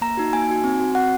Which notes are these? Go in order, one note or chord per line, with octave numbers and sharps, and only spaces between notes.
A#3 A#5
D#4 F#4
A#3 G#5
D#4 F#4
C4
F#4
C4 F#5